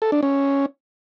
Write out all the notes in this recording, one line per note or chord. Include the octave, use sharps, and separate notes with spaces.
A4
D4
C#4